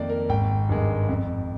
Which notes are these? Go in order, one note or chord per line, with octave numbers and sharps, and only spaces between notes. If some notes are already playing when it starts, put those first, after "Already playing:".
Already playing: F2 D#3 A#3 D5
A#4
G#1 G5
G2 D#3 G#3
F2